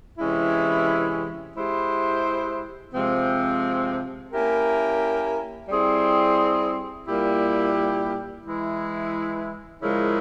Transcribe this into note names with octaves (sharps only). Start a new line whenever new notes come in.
C3 E3 G#3 C#4 E4
G#3 E4 G4 C5
C3 F3 G#3 C4
A#3 C#4 E4 G4 A#4
G3 C4 E4 G#4
A#2 G3 A#3 E4 G4
E3 G#3 E4
C#3 F3 G#3 E4 A#4